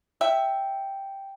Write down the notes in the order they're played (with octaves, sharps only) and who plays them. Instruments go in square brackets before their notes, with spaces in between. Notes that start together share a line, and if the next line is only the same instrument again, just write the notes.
[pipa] E5 [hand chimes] G5 A5